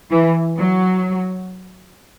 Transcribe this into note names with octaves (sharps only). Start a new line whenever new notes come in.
E3
F#3